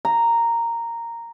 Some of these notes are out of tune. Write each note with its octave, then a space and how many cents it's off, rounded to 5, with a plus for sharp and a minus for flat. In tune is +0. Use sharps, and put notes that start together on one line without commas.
A#5 -5